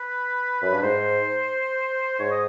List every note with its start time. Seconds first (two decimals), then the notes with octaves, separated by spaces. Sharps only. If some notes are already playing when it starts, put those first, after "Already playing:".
Already playing: B4
0.62 F#2
0.72 G2
0.82 G#2 C5
2.19 G#2 C#5
2.31 D#5